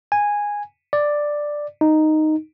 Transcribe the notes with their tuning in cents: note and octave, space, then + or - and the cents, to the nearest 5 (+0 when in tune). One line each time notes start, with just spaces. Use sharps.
G#5 -10
D5 +5
D#4 -5